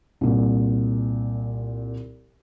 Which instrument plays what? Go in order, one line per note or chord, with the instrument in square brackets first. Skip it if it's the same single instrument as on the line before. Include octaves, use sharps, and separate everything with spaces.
[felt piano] C2 A#2